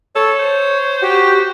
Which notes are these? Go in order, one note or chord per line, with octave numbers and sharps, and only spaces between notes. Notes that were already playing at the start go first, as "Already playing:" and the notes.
A4 C#5
C5
F#4 G4